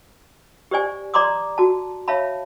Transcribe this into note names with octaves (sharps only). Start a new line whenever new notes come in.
G4 C5 D5 G#5
D5 A#5 C6 D6 D#6
F#4 A5
C#5 E5 F5 A5 B5